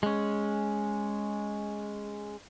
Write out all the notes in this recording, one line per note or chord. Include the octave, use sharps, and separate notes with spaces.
G#3 C#4